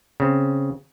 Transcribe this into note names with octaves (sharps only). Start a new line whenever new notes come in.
C#3 C4